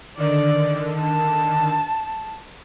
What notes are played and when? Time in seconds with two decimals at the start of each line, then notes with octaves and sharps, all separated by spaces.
0.17 D3 D#3 D5
0.98 A5